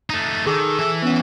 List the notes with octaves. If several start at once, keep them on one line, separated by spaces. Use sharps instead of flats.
A3 D#4
D#3 G#4 A4 D6
E3 E5
B3 C#4